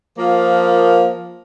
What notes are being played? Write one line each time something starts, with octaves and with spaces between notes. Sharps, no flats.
F3 A#3